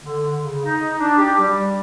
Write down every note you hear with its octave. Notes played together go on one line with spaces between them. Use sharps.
D3
C#3
D#4
D4
G4
G3